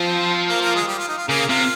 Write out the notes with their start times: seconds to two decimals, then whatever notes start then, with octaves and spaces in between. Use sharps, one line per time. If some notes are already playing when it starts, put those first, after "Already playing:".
Already playing: F3 C4 C5
0.48 A#3 A#4
0.61 A#3 A#4
0.75 G#3 G#4
0.88 G3 G4
0.99 F4
1.08 D#4
1.18 F4
1.28 C#3 A#3 A#4
1.48 C3 F4